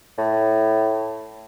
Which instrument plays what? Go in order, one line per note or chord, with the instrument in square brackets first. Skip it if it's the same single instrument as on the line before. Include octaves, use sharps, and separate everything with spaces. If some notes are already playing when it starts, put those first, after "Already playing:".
[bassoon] A2